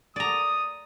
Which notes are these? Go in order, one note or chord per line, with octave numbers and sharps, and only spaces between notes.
D5 A#5 D#6